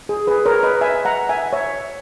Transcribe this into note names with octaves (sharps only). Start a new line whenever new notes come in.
G#4
G#4 B4
A#4 C#5
B4 D#5
E5 G#5
F#5 A#5
E5 G#5
C#5 E5